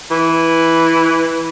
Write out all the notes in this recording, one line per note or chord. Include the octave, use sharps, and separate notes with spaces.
E3